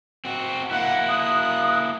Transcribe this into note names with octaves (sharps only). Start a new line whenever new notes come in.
C4 F#4
A#3 E4 F#5
D#6 F#6